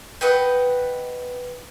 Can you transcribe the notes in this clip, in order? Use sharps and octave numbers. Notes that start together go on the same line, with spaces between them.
B4 D#5 F#5 G5